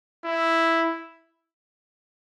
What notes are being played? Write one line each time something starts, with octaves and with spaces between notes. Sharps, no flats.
E4